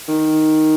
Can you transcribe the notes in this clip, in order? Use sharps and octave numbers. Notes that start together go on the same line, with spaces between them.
D#3